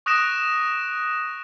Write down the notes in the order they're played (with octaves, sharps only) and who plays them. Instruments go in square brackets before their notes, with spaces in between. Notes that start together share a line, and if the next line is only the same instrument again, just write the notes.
[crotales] C#6 D#6 F#6 A#6 D7 E7